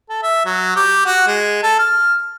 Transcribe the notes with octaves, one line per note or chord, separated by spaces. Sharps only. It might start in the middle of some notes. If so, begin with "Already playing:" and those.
A4
E5
F#3
G4
F#4
G#3
A4
F6